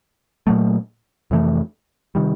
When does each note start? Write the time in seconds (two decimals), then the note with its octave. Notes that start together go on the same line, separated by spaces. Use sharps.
0.47 A#2 F#3 A3
1.31 F2 C3 E3 A3
2.15 C3 D#3 G3